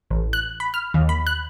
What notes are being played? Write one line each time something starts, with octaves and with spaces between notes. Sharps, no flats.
A1
F#6
B5
F6
D#2
B5
F#6